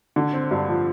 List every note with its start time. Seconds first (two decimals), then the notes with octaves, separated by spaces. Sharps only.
0.16 D3
0.33 C4
0.51 G2
0.68 F3